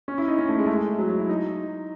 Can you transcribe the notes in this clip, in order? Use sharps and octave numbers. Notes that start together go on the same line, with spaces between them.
C#4
E4
D#4
C#4
A3
G#3
A3
G#3
F#3
F#3
E4
D#4